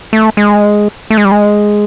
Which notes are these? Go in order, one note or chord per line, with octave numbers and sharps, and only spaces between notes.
A3
G#3
A3
G#3
G3
G#3